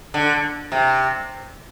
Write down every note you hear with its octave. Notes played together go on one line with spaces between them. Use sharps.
D3
C3